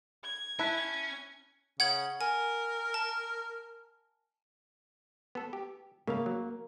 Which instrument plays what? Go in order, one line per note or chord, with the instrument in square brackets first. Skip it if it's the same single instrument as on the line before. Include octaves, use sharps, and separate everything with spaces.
[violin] G#6
[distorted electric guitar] C#4 [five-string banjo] E4 [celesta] A5 F#6 B6
[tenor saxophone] C#3 [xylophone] F#5 G#6 F#7
[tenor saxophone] A#4 [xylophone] G#5
[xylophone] A5
[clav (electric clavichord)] B3 A4
G4
[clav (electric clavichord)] C#3 A3 F5 [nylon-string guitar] A#3
[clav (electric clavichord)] F#3